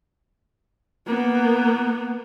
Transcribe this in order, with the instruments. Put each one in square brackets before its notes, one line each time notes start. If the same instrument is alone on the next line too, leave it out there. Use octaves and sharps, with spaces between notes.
[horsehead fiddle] A#3 B3